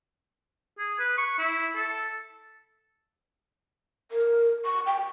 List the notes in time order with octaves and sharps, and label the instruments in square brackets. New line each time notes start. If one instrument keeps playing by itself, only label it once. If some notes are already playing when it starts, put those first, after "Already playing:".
[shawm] G#4
B4
C#6
E4
A4
[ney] A#4
C#6
G5